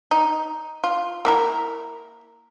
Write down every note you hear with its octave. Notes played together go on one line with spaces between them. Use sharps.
D#4
F4
A#3 E4 A#4